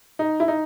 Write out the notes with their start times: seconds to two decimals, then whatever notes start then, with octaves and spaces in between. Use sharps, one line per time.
0.19 D#4
0.40 E4
0.48 D#4